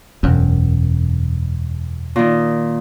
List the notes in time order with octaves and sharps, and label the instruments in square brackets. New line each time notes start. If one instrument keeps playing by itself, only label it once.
[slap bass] E1 F#2
[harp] A#2 D#3